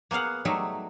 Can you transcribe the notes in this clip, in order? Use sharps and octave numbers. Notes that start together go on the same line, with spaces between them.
A#3 B3 G#4 F5 F#5
F#3 G3 A3 D#4 G#4 E5